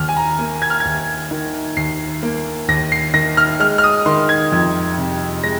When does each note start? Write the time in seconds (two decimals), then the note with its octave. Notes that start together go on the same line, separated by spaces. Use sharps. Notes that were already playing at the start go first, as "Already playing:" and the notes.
Already playing: D#2 F6
0.09 G#5
0.17 A#5
0.39 A#3
0.62 G#6
0.70 F6
0.80 D#2 G#6
1.31 D#3
1.77 D#2 C7
2.23 A#3
2.68 D#2 A#6
2.92 C7
3.14 D#3 A#6
3.37 F6
3.60 G#3 F6
3.78 F6
3.84 D#6
4.06 D#3 C6
4.29 G#6
4.52 F2
4.98 C3
5.44 G#3 A#6